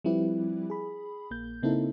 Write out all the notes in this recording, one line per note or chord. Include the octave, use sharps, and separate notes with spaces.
F3 G3 C4 E4 G4 B4
G#4 B5
A#1 A#3 G6
C#3 A#3 C4 D#4 E4 A4